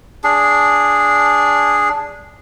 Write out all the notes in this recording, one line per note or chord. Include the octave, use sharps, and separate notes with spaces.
D4 G#4